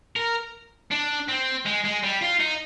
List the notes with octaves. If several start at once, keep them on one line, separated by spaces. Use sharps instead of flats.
A#4
D4
C4
G#3
G#3
G3
F4
D#4